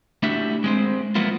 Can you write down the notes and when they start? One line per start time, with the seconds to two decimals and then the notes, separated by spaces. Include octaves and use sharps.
0.23 A3 D4 E4 F#4 G4 E5
0.64 G#3 C4 C5
1.15 F3 F#3 A#3 B3 E4 F4